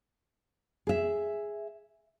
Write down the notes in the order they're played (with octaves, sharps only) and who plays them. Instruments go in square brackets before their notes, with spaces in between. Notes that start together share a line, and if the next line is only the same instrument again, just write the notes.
[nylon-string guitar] G#4 E5